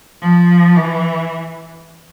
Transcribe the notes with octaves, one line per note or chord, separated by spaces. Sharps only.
F3
E3